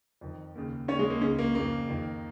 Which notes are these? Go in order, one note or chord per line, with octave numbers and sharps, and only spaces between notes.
F2 D#3
D#2 C#3
D#2 C#3 C#4 C#5
G#3 G#4
A#3
C#2 C#3 C#4
A#3
F2 C#3 A#3
F2 D#3